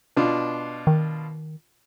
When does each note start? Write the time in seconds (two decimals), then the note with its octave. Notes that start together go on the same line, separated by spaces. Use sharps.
0.17 B2 D4 F4
0.87 D#3